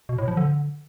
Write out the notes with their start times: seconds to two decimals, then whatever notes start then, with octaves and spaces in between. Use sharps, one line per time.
0.09 B2
0.18 A2
0.28 F3
0.37 D3